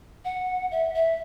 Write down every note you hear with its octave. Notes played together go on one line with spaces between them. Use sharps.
F#5
E5
E5